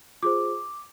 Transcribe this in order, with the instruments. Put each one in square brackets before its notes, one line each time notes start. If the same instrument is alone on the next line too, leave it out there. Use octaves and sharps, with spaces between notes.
[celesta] F4 G#4 C5 D6